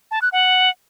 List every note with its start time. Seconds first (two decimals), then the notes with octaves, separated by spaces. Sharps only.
0.11 A5
0.22 F#6
0.32 F#5